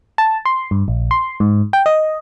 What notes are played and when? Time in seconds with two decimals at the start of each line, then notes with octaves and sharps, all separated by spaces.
0.18 A5
0.45 C6
0.71 G2
0.88 A#1
1.11 C6
1.40 G#2
1.73 G5
1.86 D#5